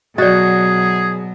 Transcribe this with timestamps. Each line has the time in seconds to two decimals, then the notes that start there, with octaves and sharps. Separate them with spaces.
0.18 B2 F#3 F#4 G#4 D5 D#5